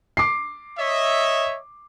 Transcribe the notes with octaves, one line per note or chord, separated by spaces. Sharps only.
D6 C7
C#5 D#5 E5